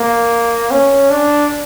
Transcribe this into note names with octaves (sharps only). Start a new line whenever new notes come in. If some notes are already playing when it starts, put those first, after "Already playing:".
Already playing: A#3
C#4
D4